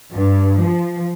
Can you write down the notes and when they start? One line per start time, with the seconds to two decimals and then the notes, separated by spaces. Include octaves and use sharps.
0.11 G2
0.58 F3